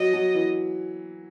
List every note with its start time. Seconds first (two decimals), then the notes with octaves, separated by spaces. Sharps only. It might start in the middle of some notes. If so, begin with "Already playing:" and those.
Already playing: F#3 D#5
0.14 F#3
0.35 E3